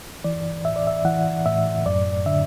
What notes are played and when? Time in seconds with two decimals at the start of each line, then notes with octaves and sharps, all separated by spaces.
0.24 E3 D5
0.65 A2 E5
0.76 D5
0.87 E5
1.05 E3 F#5
1.46 A2 E5
1.86 F#2 D5
2.26 D3 E5